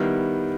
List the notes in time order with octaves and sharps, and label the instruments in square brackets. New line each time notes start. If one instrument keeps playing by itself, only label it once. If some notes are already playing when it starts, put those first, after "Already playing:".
Already playing: [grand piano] D#3 G3 B3 E4